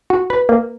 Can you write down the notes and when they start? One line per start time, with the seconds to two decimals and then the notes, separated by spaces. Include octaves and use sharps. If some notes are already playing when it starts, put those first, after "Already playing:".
0.10 F#4
0.30 B4
0.49 A#3